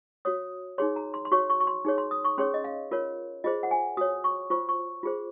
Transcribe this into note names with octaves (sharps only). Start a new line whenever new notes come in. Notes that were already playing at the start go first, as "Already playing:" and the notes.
F#4 C#5 D#6
D#4 G#4 C#5 C6
A#5
C6
C6
F#4 C#5 C#6
C#6
C#6
C6
D#4 G#4 C#5
C6
D#6
C#6
C#4 G#4 C#5 C6
D#5
F5
F4 A#4 C#5
F4 G#4 C5 D#5
F#5
G#5
F#4 C#5 D#6
C#6
F4 C5 C#6
C#6
F4 G#4 C5